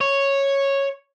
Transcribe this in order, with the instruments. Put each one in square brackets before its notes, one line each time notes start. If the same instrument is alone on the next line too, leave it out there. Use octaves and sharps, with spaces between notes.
[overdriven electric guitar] C#5